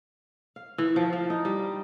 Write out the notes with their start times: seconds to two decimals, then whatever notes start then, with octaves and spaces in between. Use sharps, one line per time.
0.56 F5
0.78 E3
0.96 F3
1.13 F3
1.30 D#4
1.45 G3